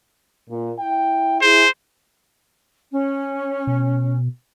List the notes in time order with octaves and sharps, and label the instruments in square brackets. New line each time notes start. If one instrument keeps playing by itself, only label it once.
[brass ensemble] A#2
E4 G5
[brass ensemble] E4 G#4 [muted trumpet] C5
[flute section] C#4
[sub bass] B2